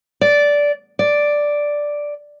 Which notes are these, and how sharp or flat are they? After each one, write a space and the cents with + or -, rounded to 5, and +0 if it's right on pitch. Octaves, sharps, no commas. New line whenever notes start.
D5 -10
D5 +0